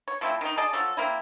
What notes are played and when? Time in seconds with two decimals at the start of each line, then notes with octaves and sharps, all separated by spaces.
0.08 C#5
0.21 F3 A3 C4 E4
0.41 D#3 D#4
0.57 G#4 D5 D#5 A5
0.73 F3 F#3 A4
0.97 A#3 C4 E4